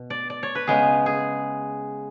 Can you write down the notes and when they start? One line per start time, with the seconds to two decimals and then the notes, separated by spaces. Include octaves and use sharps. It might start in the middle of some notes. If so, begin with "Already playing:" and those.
Already playing: B2
0.10 D5
0.30 D5
0.43 C#5
0.55 B4
0.67 C#3 G#3 B3 G#4
1.06 G#4